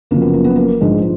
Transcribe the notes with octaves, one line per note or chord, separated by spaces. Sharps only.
F#1 F#2 C#3 F3 A#3
B3
A#3
B3
A#3
A#1 G#2 F3 G#3